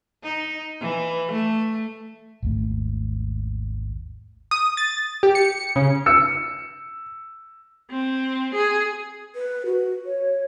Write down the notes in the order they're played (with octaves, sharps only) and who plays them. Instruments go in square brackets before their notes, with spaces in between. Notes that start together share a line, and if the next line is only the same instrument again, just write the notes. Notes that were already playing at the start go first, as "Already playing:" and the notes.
[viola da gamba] D#4
E3
A3
[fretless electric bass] G#1 D#2 A3
[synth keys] D#6
A6
G4
C#7
C#3
[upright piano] E6 C#7
[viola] C4
G#4
[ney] B4
F#4
C#5